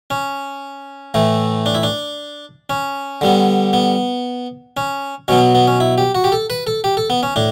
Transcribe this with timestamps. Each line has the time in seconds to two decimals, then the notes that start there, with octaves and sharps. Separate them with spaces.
0.11 C#4
1.14 A2 E3 A3
1.66 D4
1.75 E4
1.83 D4
2.70 C#4
3.21 D3 G3 B3
3.73 B3
4.77 C#4
5.28 B2 F#3 B3 C#4
5.55 B3
5.67 C#4
5.80 E4
5.98 G4
6.15 F#4
6.24 G4
6.32 A4
6.50 B4
6.67 A4
6.84 G4
6.97 A4
7.10 B3
7.23 C#4
7.36 A2 D4